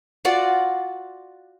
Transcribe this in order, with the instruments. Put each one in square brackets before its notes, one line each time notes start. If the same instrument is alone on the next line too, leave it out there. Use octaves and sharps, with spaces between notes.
[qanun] F4 F#4 D5 F#5